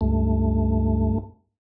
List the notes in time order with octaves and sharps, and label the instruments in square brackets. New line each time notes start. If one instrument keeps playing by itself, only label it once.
[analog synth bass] C#2 [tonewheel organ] G2 A3